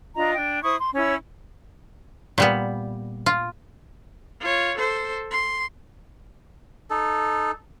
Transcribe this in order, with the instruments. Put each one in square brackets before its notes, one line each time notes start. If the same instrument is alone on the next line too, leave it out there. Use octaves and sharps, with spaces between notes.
[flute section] D4 F4 D#5 A#5
D4 G5
E4 C5 C#6 D#6
C6
C#4 E4 C#5 E6
[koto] A#2 G3 B3
F4
[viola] F4 C#5
A4 C5
C6
[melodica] D#4 A4